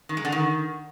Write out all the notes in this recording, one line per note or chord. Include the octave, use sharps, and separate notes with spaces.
D#3
G#3
D3
D#3